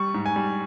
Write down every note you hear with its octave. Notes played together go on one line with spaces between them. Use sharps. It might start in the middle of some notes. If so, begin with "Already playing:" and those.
Already playing: G3 C#6
G#2
G#5
G3